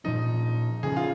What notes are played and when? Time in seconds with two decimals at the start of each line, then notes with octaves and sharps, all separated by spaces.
0.04 A#2 F3 C#4 D#4
0.83 C#3 F3 C#4 G#4
0.97 F4